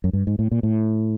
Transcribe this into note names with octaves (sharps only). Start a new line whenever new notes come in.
F#2
G2
G#2
A2
A#2
A2